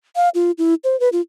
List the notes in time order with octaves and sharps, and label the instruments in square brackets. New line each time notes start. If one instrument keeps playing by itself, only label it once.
[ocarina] F5
F4
E4
C5
B4
F4